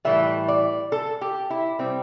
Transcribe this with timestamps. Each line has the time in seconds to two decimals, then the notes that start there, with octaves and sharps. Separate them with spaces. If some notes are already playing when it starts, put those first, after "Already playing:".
0.05 A2 E3 G3 E5
0.48 D5
0.92 A4
1.21 G4
1.50 E4
1.79 C3 G3 C4